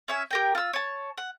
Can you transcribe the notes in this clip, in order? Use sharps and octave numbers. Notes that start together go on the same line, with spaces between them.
C#4 E5 G#5
G4 A#4 G5
F4 E6
C#5 A5
F#5